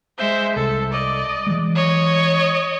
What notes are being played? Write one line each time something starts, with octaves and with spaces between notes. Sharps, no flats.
G#3 C5 E5
C2 A4
D5 D#5
E3 F#3 G#3
C#5 D#5